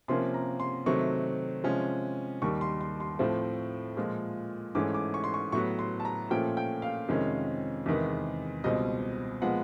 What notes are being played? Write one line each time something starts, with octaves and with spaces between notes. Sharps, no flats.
C3 F3 A#3 C#4 C6
A#5
C6
C3 D#3 F#3 A3 C4 C#6
C3 F3 G#3 C#4
D#2 D#3 G3 C#6
C6
C6
C6
A2 F3 A3 C4
A#2 F3 G#3
G#2 E3 A3 C#4 D6
D6
C#6
C6
C#6
A2 F#3 B3 C#6
C6
A5
A#5
A#2 F3 A3 C#4 G5
G5
F5
F2 C3 D#3 G#3 C#4
E2 C3 D#3 G#3 B3
C#2 B2 G3 C4 D#5
A#2 F3 G#3 B3 F#5